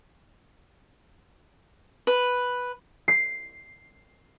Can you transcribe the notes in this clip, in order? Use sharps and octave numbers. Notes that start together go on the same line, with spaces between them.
B4
C7